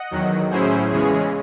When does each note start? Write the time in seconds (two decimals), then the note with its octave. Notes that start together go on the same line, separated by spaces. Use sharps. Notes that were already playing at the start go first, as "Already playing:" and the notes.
Already playing: D#5 F#5
0.11 E2 D#3 F#3
0.50 A2 F#3 C#4 E4 G#4 C5
0.90 E2 C#3 E3 G#3 C#4 G#4